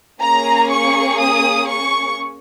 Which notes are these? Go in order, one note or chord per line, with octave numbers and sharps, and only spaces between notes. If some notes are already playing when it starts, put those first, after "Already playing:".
A#3 C#4 G#4 A#5
C#6
D#6
C#6